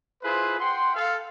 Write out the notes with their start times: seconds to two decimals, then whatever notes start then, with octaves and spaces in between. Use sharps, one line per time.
0.23 E4 F4 G#4 B4 C5
0.60 F#5 G5 C6
0.95 A4 F5